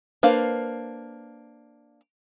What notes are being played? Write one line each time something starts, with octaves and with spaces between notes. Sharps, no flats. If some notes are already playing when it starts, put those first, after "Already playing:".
A#3 D4 B4 C5 F5